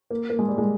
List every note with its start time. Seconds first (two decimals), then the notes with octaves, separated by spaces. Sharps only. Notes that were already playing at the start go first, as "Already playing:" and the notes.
0.11 A#3
0.30 A#3
0.39 G#3
0.48 G3
0.58 G#3